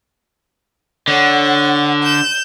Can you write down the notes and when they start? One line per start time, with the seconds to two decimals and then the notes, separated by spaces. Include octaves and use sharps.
1.08 D3 C#5 F#5
2.03 G6 E7